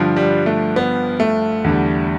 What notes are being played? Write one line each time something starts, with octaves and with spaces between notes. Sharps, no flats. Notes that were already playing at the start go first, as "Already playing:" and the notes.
Already playing: G2 D3 F3
G3
A3
B3
A3
E2 D3 G3